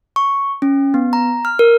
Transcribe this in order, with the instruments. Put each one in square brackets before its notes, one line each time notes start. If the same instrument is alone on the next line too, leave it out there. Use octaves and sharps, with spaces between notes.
[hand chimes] C#6
C#4
B3
A#5
F6
A#4